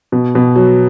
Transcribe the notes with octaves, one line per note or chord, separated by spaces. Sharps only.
B2
B2
F#3